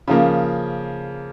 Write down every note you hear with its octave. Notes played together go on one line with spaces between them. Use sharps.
C#3 F3 A#3